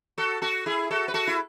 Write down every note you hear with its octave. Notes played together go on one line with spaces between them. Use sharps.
F#4 A4
F#4 A4
E4 G#4
F#4 A4
B4
F#4 A4
E4